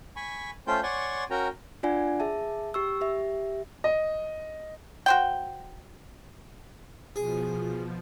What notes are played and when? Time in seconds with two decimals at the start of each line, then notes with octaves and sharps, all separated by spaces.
0.16 G#5 B5 C#6
0.67 A3 C#4 F4 C5 G5 G6
0.83 C#5 D5 F#5 G#5 C6 C#6
1.30 C#4 F#4 A#4 G5 A#5
1.83 D4 F4 D5 F#5 G#5
2.20 G#4 E5 A5
2.74 G4 C#6 E6
3.01 G4 E5
3.84 D#5
5.06 F#4 C5 G5
7.16 B2 F3 G#4